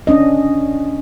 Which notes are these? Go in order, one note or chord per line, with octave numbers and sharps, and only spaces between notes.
C#4 D4 D#5